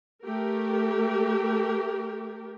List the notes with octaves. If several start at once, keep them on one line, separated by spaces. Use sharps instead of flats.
A3 G4 A#4